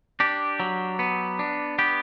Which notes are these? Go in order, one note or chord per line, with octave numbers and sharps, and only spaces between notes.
D4 G4
F#3
B3
D4
B3 G4